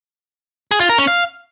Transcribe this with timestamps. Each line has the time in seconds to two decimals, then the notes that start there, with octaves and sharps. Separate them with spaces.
0.71 G#4
0.80 F4
0.89 A#4
0.98 C#4
1.07 F5